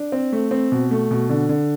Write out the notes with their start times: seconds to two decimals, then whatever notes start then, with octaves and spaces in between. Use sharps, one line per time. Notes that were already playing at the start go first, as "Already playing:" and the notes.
Already playing: D4
0.12 C4
0.33 A3
0.51 C4
0.72 B2
0.91 A3
1.11 B2
1.30 D3
1.49 D3